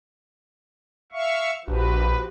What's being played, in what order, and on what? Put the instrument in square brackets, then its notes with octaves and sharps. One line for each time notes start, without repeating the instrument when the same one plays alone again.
[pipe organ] E5 F5 C#6
[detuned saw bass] A#1 [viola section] F3 F#4 G4 [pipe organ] B4